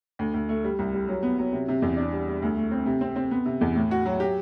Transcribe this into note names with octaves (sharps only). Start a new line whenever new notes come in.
D2
D2
A3
G3
C2
G3
F#3
B3
F#3
C3
C3
E2
D4
G3
G3
D2
A3
C4
C3
C4
C4
B3
C3
E2
A2
F#4
F#3
G4